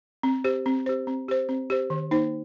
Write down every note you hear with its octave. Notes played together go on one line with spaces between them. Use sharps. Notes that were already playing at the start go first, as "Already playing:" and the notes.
C4
G4 C5
C4
G4 C5
C4
G4 C5
C4
G4 C5
D#3
A#3 D#4 C5